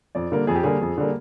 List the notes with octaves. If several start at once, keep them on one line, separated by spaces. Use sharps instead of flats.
F2 D5
D3 G3 A#3
F2 G#4
G4
D3 G3 A#3 G#4
F2
D3 G3 A#3